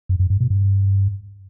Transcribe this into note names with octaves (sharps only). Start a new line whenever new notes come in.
F#2
F#2
G2
B2
G2